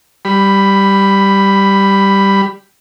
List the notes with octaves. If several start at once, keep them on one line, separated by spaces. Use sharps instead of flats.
G3 B5